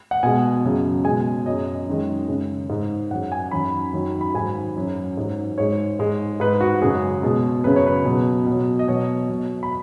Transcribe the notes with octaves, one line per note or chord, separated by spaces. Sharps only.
F#5
B2 G#3 G#5
F#2 C#3 F#3
B2 G#3 G#5
F#2 F#3 D#5
F#2 D#3 G#3
F#2 C#3 G#3
G#2 G#3
F#2 F#3 F#5
G#5
F#2 D#3 F#3 B5
F#2 D#3 F#3
B5
G#2 F#3 G#5
F#2 F#3
G#2 F#3
G#2 G#3 C#5
G#2 G#3
G#2 G#3 B4
F#4
F#2 C#3 G#3 G#4
B2 G#3
F#2 C#3 F#3 B4
C#5
B4
B2 F#3
B2 F#3
D#5
B2 F#3 C#5
B2 F#3
B5